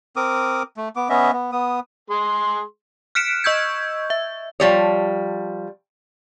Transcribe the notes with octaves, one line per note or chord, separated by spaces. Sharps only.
C4 A#4 D6 D#6
A3
B3 D6
B3 C#4 D#5 E5
B3
B3 D#6
G#3 G#4 C6
F6 F#6 B6 C#7 D7 E7
D#5 C#6 E6 G6 G#6
E5
F3 G3 C#5